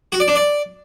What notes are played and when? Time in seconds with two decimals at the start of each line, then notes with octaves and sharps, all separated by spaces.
0.12 F#4
0.20 D5
0.28 D4
0.36 D5